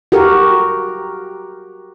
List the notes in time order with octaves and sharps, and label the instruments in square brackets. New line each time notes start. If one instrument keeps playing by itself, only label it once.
[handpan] F#4 G4 A#4